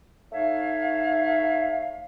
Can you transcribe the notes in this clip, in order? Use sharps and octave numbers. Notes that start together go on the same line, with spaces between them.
A3 D#4 C#5 E5 F5